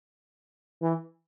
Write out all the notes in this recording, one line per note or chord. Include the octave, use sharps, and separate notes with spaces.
E3